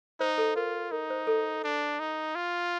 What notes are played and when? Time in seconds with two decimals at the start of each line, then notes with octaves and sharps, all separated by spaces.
0.20 D#4 C5
0.38 A4
0.56 F4 A#4
0.92 D#4 A#4
1.10 C5
1.27 A4
1.64 D4
1.99 D#4
2.35 F4